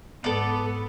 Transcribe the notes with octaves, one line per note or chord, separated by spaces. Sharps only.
G#2 B3 A4 D5